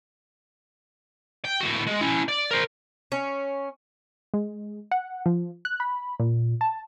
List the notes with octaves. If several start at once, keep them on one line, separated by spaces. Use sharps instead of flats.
G5
A2 F#4
G#3
C#4 E4
D5
A#4 C5
C#4
G#3
F#5
F3
F#6
B5
A#2
A5